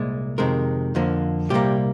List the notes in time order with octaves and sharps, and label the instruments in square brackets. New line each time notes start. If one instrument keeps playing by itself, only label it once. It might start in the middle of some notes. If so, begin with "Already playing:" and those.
Already playing: [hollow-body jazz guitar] C2 A#2 G#3
F2 C3 D#3 G#3 A#4
F2 D3 F3 A#3
C2 A#2 G3 A#3 G4